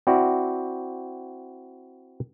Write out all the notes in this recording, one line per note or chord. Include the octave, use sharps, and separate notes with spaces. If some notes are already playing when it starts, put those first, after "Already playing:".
C4 E4 F#4 D5